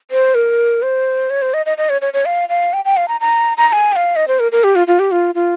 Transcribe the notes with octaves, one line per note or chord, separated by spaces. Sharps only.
C5
A#4
C5
C#5
C5
D#5
D#5
D#5
C#5
C#5
C#5
F5
F5
G5
G5
F5
A#5
A#5
A#5
A#5
G#5
G5
F5
D#5
C5
A#4
A#4
G4
F4
F4
G4
F4
F4